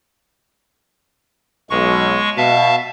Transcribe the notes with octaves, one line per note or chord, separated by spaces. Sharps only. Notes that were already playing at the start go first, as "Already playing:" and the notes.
B1 G#3 C#6
B2 E5 F5 A5